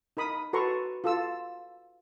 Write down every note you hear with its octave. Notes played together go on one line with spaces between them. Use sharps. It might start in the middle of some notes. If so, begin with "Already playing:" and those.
D#4 A#4 B5 D#6
F#4 A4 B4 A#5 C6 C#6
F4 A4 E6